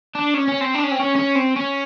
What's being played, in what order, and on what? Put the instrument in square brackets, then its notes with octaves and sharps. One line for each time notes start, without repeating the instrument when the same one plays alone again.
[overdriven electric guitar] D4
C#4
C#4
C4
D4
C#4
C4
C#4
C#4
C4
C#4